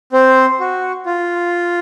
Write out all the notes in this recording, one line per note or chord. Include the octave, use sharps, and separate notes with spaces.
C4 C5
F#4
F4